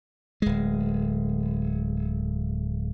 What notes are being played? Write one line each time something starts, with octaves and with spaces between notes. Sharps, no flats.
D1 G#3